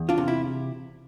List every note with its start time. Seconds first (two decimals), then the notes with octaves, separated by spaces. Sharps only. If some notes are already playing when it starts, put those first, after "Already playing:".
Already playing: E2
0.09 D4 F4
0.18 C3
0.28 E4